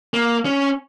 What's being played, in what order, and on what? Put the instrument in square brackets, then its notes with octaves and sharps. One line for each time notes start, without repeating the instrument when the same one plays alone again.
[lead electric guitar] A#3
C#4